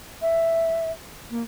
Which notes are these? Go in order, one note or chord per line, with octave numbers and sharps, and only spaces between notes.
E5
A#3